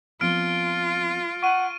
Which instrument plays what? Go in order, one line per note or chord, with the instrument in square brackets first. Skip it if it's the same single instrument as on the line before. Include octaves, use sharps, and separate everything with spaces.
[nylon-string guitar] F3 B3 C4 [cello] F4 [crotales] F6 D7
[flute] F#5 [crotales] C#6 D#7